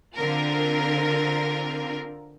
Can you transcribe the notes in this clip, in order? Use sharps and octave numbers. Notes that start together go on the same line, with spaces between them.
D3 C4 F4 A#4